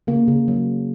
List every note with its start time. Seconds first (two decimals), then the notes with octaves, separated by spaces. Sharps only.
0.07 C#3 A#3
0.28 C#3
0.48 F#3